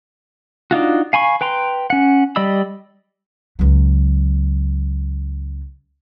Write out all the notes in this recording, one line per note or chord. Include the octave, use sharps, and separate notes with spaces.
D4 D#4 F4 F#4
F5 G#5 B5 C#6
B4 G5 A#5 C6
C#4 F#5
G3 D5 D#5 B5 E6
C#2 F#3